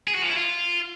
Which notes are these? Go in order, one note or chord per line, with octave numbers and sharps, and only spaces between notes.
G#4
F#4
F3
E4
F4